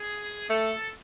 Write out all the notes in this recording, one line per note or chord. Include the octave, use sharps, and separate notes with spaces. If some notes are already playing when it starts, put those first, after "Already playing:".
Already playing: G#4
A3 A4